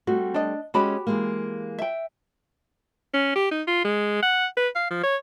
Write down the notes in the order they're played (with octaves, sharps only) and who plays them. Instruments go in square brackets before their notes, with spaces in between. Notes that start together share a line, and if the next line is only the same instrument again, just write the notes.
[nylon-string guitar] G3 A3 C4 [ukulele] F#4
[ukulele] D4 D#5
[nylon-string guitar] G#3 C#4 D#5 [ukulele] F#4 G4 B5
[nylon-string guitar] E3 G#3 A#3
[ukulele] E5 G5
[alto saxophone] C#4
G4
D#4
F4
G#3
F#5
B4
F5
F3
C#5